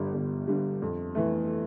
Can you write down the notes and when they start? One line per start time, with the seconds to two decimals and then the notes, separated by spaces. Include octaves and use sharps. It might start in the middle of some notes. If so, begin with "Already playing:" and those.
Already playing: G1 G2 D3 G3
0.14 G1
0.47 G2 D3 G3
0.82 F2
1.15 E3 A3